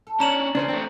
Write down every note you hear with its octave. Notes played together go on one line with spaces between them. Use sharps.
A4
C#4 D4 A#5 E7 F#7
C#3 C#4 D4 A#4 C5
E2 E3 A3 C4